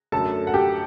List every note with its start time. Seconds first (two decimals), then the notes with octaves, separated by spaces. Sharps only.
0.12 F#2 D3 F#3 A3 A4 A5
0.47 F#5
0.54 G4 G5